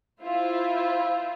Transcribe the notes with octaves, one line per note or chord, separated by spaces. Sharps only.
E4 F4 C5